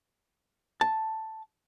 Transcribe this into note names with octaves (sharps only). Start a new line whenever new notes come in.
A5